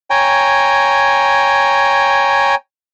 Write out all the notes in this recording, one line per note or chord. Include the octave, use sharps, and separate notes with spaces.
C#5 G5 G#5 A#5